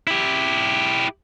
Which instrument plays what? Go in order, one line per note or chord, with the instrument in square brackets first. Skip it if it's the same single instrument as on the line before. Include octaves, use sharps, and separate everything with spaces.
[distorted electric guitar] E4 G4